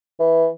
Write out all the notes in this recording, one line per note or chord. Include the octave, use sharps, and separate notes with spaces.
E3